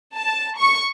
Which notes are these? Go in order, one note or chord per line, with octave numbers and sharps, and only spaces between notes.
A5
C#6